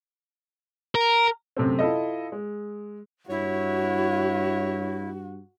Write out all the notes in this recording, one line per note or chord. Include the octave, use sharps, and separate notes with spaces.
A#4
F#2 C3 A3 C4
E4 F4 A4 D#5
G#3
G2 E4 F#4 C#5